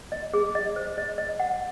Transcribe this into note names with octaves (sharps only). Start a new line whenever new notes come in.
D#5
G#4
D#5
C5
D#5
D#5
F#5